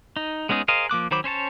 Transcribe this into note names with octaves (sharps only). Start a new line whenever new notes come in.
D#4
G#3 B3 C#4 D#4 G#4
G#4 A#4 C5 D#5 F5
F3 A#3 D6 F#6
D#3 F#3 C5 B5 D6
C#4 C5 C#5 A5